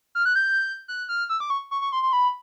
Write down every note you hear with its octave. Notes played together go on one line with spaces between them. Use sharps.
F6
F#6
G6
F#6
F6
E6
D6
C#6
C#6
C#6
C6
C6
B5